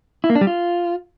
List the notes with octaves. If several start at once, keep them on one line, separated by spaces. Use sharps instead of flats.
E4
A#3
D4
G3
F4